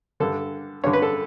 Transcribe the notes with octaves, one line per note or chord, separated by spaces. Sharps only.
G2 D3 A4
G2 D3 C#5
B4
A4